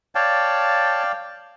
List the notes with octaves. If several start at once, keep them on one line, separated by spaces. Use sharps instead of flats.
C#5 D5 F5 G5 A5